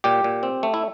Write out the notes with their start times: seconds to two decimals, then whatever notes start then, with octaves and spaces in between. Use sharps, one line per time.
0.04 A#2 G4
0.24 A#2
0.43 C4
0.63 A3
0.74 E4